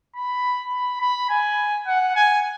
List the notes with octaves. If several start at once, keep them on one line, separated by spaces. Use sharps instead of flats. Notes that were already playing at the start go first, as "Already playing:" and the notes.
B5
B5
B5
G#5
F#5
G#5